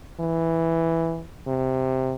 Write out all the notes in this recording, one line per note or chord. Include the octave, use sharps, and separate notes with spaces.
E3
C3